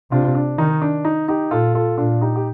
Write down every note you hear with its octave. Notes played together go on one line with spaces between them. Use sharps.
C3 D4 F4
D4
D#3 D#4
D4
D#4
D#4 G4
A#2 F4 A4
F4 A4
A#2 D4 F4
D#4 G4
G4